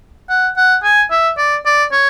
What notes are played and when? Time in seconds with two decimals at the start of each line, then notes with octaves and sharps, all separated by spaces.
0.29 F#5
0.57 F#5
0.84 G#5
1.11 E5
1.37 D5
1.66 D5
1.92 C#5